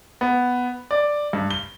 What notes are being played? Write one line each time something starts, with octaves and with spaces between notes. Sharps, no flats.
B3
D5
G2
G7